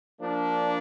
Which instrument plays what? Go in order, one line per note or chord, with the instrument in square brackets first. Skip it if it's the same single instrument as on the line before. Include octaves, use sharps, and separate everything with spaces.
[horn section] F3 A#3 D4